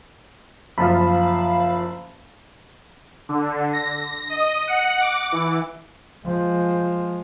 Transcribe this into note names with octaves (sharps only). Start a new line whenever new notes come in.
F#1 F3 F5 A5 B5
D3
A#6
D#5
F#5
D6
E3
F3 G#3